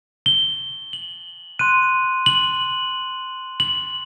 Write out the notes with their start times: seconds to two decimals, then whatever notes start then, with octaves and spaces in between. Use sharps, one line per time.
0.26 G7
0.93 F#7
1.59 C6 F#6 D#7
2.26 F#7
3.60 F#7